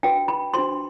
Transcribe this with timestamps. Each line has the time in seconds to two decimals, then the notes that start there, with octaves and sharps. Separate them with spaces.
0.03 D4 F#4 B4 G5
0.28 B5
0.54 D4 F#4 C5 C6